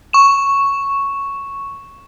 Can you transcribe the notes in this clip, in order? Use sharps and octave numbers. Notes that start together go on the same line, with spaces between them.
C#6 E7